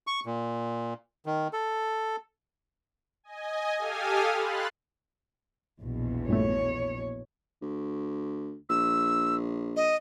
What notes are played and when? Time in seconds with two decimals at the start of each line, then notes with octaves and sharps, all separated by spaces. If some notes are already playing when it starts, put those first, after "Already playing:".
0.07 C#6
0.26 A#2
1.26 D#3
1.53 A4
3.24 D#5 G#5
3.78 G4 A4 F5 G#5 D#6 F6
4.32 B5 C6 F#6 A6
5.80 A#1 E2 B2
6.28 G2 A#2 A3 C#5
7.62 D2
8.69 A#1 E6
9.76 D#5